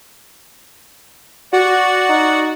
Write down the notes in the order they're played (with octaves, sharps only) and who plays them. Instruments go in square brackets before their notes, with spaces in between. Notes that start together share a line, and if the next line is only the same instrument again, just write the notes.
[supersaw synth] F#4 [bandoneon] D5 F#5
[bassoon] D#4